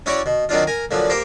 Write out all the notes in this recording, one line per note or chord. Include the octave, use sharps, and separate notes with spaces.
C#4 E4 F#4 C#5 D5
B2
D#3 F#3 C4 D4 F4
A#4 G#5 A#5
A#2 D3 F3 F#3
A#3 G4 A#4 C5